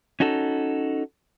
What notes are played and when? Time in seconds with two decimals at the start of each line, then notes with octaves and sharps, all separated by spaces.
0.20 C#4 D#4 F#4 A4